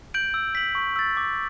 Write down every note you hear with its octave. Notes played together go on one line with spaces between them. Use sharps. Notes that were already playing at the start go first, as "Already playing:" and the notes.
G6 D7 F#7
E6
B6 F#7
C#6
E6 A6
D6